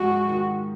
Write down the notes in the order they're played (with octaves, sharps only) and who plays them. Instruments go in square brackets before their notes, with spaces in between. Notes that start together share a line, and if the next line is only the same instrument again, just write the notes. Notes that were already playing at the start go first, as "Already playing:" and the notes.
Already playing: [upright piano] G#2 F3 G#3 [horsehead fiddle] F#4
[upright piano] D#3